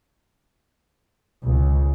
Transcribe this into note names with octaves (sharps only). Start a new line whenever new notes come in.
C#2